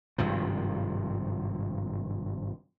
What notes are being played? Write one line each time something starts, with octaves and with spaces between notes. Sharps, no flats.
G#1 G2 C3 F3